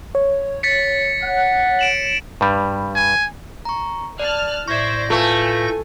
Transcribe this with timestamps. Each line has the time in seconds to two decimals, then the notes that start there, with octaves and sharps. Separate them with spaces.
0.15 C#5
0.63 A6 B6 C#7
1.23 F#5
1.79 D7 E7 F#7
2.41 G2 G3
2.95 G#5
3.65 A#5 C#6
4.19 D5 A5 F6 F#6
4.68 A2 C5 D5 E5 C#6 G6 G#6 A#6
5.10 A3 F4 B4 F5 G#5